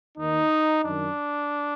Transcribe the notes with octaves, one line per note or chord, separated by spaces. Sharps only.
D#2 D#3 D#4
F#2 D#3 D4